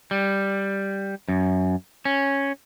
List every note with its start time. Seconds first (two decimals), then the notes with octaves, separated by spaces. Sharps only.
0.11 G3
1.28 F#2
2.05 C#4